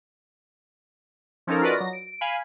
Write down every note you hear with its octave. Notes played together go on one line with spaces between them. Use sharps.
F3 C#4 D#4 A4 A#4
F4 F#4 A#4 B4 D5 D#5
F#3 A#6
D7
F5 G#5 B5